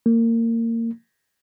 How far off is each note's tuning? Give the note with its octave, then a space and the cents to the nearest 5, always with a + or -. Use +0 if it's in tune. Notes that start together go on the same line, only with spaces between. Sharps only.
A#3 -25